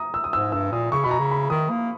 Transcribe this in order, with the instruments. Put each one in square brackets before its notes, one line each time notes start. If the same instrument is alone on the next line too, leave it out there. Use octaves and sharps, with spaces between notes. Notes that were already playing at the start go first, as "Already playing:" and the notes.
Already playing: [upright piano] A#5 D#6
E6
D#6
[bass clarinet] G#2 [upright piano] E6
[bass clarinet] G2 [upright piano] E6
[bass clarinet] A#2 [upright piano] D#6
[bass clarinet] C#3 [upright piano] C#6
[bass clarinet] B2 [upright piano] B5
[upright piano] A#5
[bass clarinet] C#3
[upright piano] B5
[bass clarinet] D#3 [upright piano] D#6
[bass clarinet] A#3